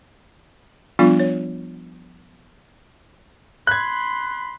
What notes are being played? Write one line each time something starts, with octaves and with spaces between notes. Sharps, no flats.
F3 G3 B3 D4 F4
C#5
B5 C6 F#6 G#6